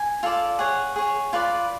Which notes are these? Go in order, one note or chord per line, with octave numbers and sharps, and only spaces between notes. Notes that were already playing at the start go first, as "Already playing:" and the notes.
Already playing: G#5
F4 A4 D5
G#4 C#5 F#5
G#4 C#5
F4 B4 D5